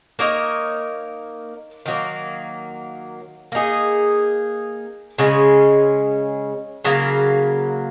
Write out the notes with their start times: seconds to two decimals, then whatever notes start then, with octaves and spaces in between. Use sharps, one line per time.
0.19 A#3 D#4 A#4 C#5
1.86 D#3 F#3 A#3
3.52 A#3 D#4 G#4
5.18 C#3 G#3 C#4
6.84 C#3 F#3 A#3